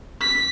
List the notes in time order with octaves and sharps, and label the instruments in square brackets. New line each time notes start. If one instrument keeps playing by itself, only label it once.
[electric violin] B6